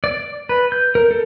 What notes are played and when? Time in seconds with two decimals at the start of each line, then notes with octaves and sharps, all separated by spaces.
0.04 D5
0.49 B4
0.72 G6
0.95 A#4
1.11 A4